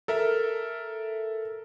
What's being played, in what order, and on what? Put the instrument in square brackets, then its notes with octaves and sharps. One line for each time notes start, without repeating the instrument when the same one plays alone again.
[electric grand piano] A4 A#4 E5